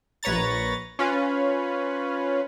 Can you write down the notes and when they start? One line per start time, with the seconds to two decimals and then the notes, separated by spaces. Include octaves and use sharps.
0.23 A#1 B4 C#5 A#5 A6
0.99 C#4 F4 B4